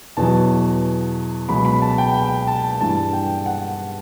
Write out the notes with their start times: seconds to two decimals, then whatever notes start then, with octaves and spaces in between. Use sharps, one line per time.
0.17 E2 B2 F#3 A5
1.49 C#2 B2 F#3 B5
1.65 B5
1.82 A5
1.98 G5
2.14 G5
2.47 A5
2.80 G2 E3 A5
3.13 G5
3.46 F#5